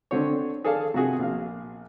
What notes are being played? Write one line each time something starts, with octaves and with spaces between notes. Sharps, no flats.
D3 C4 C#5
G#4 A4 D5 F5 A5
C3 F4 F#4 G#4
A#1 F5